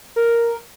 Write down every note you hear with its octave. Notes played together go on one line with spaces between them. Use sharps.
A#4